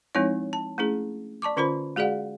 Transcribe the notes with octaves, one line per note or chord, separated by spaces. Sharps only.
F3 G#3 C4 D#4 E4 C#5
A5
A3 C#4 E4 G#4
D5 A5 C#6 D6
D3 C#4 F4 A#4 C5 B5
G#3 F#4 G#4 D5 F5 F#5